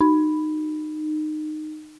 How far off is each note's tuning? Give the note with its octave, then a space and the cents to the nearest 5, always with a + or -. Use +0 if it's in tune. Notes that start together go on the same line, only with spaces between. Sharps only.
D#4 -20